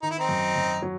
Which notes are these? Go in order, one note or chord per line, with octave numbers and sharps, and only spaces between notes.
D#3 D#4
E4
C4 D#4
F#2
F#2
F#3